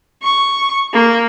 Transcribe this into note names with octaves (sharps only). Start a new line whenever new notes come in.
C#6
A#3